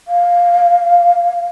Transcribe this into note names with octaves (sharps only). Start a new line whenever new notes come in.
F5